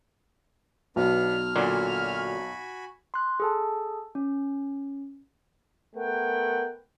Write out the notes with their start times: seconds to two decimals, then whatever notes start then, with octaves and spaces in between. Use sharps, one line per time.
0.96 B1 B3 D4 B4 F6
1.56 A#2 D3 F#3 F#4 G#5 B5
3.14 C6 F#6
3.40 G#4 A4 A5
4.15 C#4
5.95 A3 B3 A#4 F#5 G5